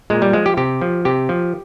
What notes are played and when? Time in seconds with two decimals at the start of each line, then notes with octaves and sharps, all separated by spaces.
0.10 A#2 G#3
0.22 G3
0.33 F3 G#3
0.46 G4
0.57 C3 G4
0.81 F3
1.05 C3 G4
1.29 F3